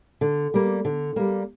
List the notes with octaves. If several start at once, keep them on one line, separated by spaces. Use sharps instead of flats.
D3
G3 A#3
D3
G3 A#3